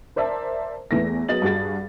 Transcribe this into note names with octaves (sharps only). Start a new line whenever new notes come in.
A#4 C5 D5 E5 A5
E2 E3 A3 A#6
F#3 B3 G#4 D#5 A6 F#7
G2 F#4 G#4 A6